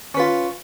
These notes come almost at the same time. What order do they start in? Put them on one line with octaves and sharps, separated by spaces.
C#4 B4 F4